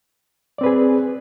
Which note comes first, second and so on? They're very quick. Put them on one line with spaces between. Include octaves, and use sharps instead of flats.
D5 C4 B4 G#4